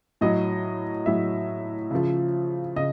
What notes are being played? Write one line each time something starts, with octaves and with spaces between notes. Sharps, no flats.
A2 F#3 D#5
A2 F#3 E5
C#3 F3
C#3 D#5